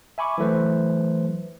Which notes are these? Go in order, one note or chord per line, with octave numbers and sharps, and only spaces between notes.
E5 G#5 B5 C#6 D6
E3 F#3 A3 B4 C5